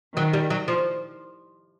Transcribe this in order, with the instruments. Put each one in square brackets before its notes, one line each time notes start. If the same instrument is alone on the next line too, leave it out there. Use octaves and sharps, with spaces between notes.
[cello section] D#3 [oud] F#3
[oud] G3
F#3
F3